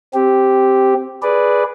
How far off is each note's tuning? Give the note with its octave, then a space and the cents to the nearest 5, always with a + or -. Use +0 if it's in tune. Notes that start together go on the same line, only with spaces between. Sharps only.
C4 +5 G4 +0
G#4 +0 B4 +0 D5 +0